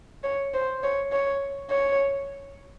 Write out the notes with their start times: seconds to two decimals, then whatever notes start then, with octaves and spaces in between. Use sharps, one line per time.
0.24 C#5
0.54 C5
0.83 C#5
1.12 C#5
1.70 C#5